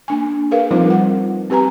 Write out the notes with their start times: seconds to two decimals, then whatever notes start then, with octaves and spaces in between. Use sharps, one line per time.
0.08 A#3 D4 G#5
0.51 G#4 A#4 B4 F5
0.71 F3 G3 C4 D#4 F4 C5
0.87 A#4 F#5
1.50 C4 G4 B4 G#5 A#5